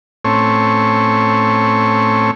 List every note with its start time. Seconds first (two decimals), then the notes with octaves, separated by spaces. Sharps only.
0.25 A2 A3 C4 C#4 C#5